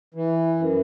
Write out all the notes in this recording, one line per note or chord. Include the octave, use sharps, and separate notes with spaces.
E3
F#2